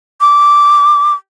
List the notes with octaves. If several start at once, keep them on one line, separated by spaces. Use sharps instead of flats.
D6